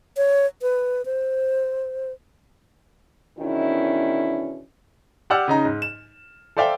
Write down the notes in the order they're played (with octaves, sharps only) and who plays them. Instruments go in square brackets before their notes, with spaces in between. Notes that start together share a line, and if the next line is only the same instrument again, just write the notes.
[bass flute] C#5
B4
C5
[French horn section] E2 B2 D#3 C#4 D4 E4
[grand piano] G4 D5 F#5 E6 F6
C#3 D#4 A#5
G#2
E7
A4 C5 D5 E5 F5 G5